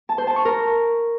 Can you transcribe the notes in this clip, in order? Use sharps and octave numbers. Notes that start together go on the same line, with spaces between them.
A5
C5
A5
C#6
A#4